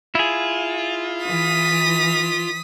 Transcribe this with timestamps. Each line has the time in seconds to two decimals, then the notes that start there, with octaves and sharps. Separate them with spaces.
0.15 E4 F4 G#4
1.24 E3 D#6 B6